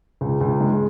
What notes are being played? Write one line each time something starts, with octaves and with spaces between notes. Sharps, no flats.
C#2
C#2
G#3